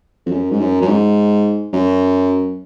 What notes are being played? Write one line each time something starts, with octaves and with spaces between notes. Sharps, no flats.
F2
F#2
G#2
F#2
F#2
G#2
F#2